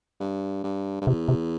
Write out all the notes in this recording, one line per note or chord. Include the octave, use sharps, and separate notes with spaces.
G2
G2
G2
E2 C3
C3